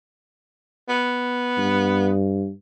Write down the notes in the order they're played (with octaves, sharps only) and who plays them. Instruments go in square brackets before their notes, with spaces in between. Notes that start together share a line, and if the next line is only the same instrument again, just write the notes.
[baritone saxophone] B3
[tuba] G2